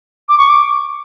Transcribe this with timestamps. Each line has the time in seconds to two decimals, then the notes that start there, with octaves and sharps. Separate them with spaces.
0.28 D6
0.37 C#6
0.48 D6